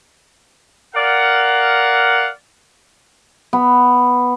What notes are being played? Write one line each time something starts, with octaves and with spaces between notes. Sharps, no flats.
A#4 D5 F5 F#5
B3